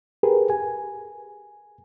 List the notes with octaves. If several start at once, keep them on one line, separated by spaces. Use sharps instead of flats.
G4 G#4 A#4 B4
G#5